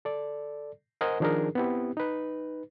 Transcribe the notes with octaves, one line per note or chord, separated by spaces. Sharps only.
A4 D5
A#4 C5 D#5 F#5 G#5
D#3 F3 D4 D#4 G#4 A#4
B3 C4 E4 G4
D#4 B4